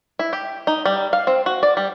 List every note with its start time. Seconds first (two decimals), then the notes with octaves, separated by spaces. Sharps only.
0.19 E4
0.33 G4
0.67 D#4
0.86 G3
1.13 F5
1.27 C4
1.46 F#4
1.63 D5
1.77 G3